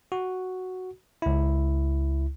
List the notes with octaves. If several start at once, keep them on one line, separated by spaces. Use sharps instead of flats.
F#4
C#2 E4